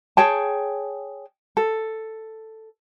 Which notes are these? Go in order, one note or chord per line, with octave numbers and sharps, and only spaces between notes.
G#4 C#5 G5 A5
A4